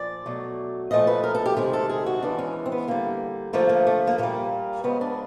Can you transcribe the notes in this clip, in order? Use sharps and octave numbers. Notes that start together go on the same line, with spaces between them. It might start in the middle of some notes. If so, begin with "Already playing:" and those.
Already playing: A#2 F3 D5
B2 F#3 A3
A#2 F3 A3 D#5
B4
A#4
A4
G4
C3 D#3 G#3 G#4
A4
G#4
F#4
C#3 E3 G#3 D4
C#4
C4
B3
D3 G3 A#3
D3 F3 A3 A#3
A#3
A3
A#3
A#2 G3 A#3
C#3 F3 G#3 B3
D4